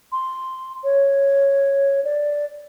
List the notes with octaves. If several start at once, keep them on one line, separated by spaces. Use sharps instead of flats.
C6
C#5
D5